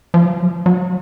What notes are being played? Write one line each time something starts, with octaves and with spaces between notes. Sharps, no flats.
F3
F#3
F3
F#3